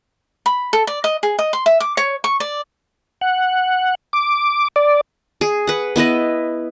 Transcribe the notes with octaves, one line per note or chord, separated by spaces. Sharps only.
B5
A4
D5
D#5
G#4
D#5
C6
E5
D6
C#5
C#6
D5
F#5
D6
D5
G#4
B4 F#5
B3 E4 B4 D#5